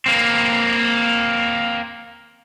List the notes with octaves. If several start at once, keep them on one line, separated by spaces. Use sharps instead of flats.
A#3 C4